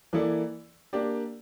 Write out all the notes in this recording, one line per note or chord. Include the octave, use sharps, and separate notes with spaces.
E3 A#3 E4 A4 D5
A#3 D4 G4 D5